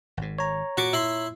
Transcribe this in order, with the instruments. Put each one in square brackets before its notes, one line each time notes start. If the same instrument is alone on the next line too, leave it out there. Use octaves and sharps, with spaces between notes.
[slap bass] G#1 G#2
[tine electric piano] C#5 A#5
[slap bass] A#2 [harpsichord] F#4 C#6 D6
[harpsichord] E4 B5 C6